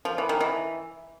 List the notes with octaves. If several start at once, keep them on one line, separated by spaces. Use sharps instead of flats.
F3
E3
D#3
E3